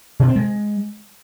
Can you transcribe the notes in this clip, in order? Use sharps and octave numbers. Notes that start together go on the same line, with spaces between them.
B2
C4
G#3